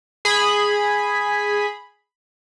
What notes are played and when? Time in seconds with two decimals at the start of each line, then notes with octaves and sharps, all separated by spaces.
0.25 G#4 B5